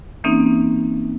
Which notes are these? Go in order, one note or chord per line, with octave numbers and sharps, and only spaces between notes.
E3 A#3 C4 C#4 D#4